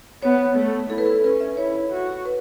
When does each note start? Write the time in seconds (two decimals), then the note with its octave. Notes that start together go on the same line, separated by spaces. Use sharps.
0.22 B3 C#5
0.56 A3
0.90 E4 A4
0.98 B4
1.07 A4
1.24 C#4 B4
1.40 E5
1.57 E4 C#5
1.91 F#4
2.26 B4